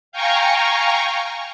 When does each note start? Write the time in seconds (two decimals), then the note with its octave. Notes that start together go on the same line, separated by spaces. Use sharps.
0.12 F5 G5 G#5 A#5 C#6